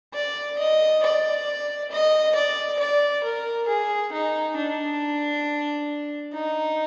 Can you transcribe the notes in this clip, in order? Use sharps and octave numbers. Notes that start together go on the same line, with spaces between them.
D5
D#5
D5
D#5
D5
D5
A#4
G#4
D#4
D4
D#4